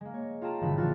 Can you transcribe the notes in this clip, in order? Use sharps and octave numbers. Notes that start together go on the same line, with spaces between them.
G#3 A#3
C#5
F4 G#4 G5 A5 A#5
G1 A#2 E3 E5 B5 A#6
A#1 F4 F#4 F6 A6